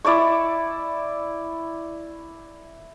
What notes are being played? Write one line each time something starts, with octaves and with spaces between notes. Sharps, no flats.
E4 D5 A5 C#6